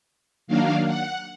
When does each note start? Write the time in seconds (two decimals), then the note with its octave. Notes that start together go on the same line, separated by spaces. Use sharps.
0.47 D#3 F#3 A#3 D4 F5
0.87 F#5